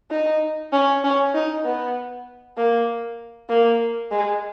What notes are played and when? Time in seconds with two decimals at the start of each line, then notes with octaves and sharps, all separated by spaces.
0.11 D#4
0.72 C#4
1.04 C#4
1.34 D#4
1.65 B3
2.57 A#3
3.49 A#3
4.11 G#3